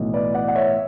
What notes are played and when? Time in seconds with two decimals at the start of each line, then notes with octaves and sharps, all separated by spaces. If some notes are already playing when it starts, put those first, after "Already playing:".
Already playing: B1 A2 E3
0.14 B4 D5
0.34 D5 F#5
0.48 F#5
0.55 C#5 E5